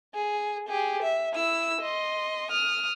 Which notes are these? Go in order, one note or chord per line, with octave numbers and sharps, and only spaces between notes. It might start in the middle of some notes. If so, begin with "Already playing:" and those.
G#4
G4 G#4
E5
E4 E6
D#5 C6
D#6 F6